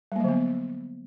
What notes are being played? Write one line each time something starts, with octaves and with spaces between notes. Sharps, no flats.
D3 F#3 G3 A#3 B3